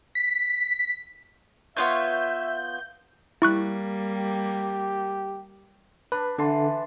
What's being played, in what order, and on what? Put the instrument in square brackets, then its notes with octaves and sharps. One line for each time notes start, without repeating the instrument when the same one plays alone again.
[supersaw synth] B6
[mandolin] B3 F4 C#5 [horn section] E5 [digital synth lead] G6
[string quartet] G3 A#3 [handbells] E4 C#6 F#6
[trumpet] G4
[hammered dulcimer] D4 [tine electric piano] B4
[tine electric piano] D3 [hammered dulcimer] E3 A5 C6